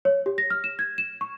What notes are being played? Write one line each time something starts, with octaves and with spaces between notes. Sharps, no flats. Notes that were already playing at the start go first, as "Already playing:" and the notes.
C#5
G4
A#6
F6
E7
G#6
E7
C#6